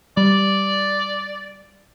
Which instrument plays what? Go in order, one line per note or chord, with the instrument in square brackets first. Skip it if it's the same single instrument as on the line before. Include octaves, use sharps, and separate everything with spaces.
[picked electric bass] G3 [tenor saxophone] D5